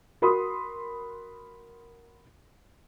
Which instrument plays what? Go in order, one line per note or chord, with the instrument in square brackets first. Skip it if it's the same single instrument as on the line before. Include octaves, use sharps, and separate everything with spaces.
[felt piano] F#4 A#4 B5 C6 D#6